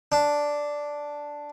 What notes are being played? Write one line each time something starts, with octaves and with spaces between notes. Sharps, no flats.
D4